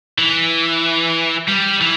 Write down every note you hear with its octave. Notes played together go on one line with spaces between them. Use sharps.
E3
G3
E3